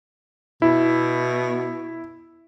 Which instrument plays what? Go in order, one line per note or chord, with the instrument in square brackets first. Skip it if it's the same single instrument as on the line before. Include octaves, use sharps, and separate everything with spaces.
[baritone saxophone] B2 [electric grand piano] E4